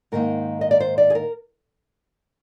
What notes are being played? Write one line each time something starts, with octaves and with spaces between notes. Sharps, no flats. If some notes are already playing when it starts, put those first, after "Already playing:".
G#2 D#3 A#3 D#4 A#4
D#5
D5
C5
D5
G#4
A#4